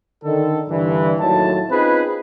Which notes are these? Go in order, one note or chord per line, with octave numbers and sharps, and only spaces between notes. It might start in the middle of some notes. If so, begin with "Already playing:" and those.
D3 D#3 A4
G2 D3 E3
D#2 A2 F#3 E4 A5
C4 C#4 D#4 F4 G#4 B4